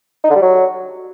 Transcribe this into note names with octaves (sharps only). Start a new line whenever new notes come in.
D#4
D3
G3
F#3